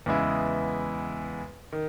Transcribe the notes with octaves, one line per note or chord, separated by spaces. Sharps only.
E2 C#3 G#3 B3 E4
D#3